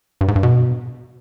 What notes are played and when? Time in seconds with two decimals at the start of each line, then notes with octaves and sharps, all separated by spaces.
0.21 G2
0.28 G#2
0.36 G2
0.43 B2